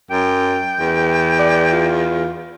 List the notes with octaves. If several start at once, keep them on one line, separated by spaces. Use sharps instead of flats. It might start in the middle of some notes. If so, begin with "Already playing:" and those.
F#2 G5
E2
D5
F4